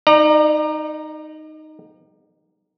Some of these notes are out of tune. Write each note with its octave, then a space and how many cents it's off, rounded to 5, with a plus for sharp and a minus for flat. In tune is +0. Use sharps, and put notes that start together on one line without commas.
D#4 +0 D5 +40 A#5 +0